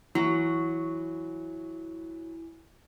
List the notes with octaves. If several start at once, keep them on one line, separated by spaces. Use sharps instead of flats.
E3 F#3